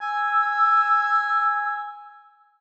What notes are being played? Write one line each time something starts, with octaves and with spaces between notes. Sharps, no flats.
G#5 E6